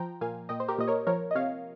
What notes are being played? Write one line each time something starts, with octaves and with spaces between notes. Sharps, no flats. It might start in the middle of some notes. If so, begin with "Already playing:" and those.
Already playing: F3 G5 A#5
A#2 F5 G#5
A#2 D#5 G5
C5
G4 A#4
A#2 D#5
A#4 C#5
F3 A#4 C#5
D#5
C3 C#5 F5